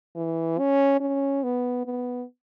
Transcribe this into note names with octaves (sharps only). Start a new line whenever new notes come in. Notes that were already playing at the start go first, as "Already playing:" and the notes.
E3
C#4
C#4
B3
B3